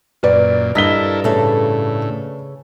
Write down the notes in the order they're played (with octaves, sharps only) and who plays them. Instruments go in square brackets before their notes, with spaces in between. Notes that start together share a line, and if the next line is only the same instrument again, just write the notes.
[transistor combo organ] F#2 A#2 [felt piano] B4 D5
[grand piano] G2 B6 G7 [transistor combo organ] E4 A4 A#4 [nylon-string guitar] D#5
[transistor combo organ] A2 [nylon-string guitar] C#3 A4 E5